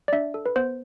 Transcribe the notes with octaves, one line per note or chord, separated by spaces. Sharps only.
D5
D4 E5
A4
B4
B3 C5